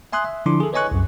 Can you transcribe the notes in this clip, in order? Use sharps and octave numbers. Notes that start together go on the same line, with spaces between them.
E5 G#5 C6 D#6 F#6
E5
D3 F3 D4 E4 C6 D6
G#4 A4
B4 C#5 D#5 G#5 C#6 F#6
C2 F#2